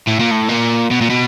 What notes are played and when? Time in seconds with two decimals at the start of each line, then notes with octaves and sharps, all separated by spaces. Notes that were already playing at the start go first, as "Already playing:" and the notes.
0.08 A2
0.20 A#2
0.31 A2
0.49 A#2
0.91 B2
1.01 A#2
1.10 B2